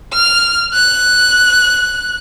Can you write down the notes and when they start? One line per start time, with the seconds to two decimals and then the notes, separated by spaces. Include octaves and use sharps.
0.14 F6
0.74 F#6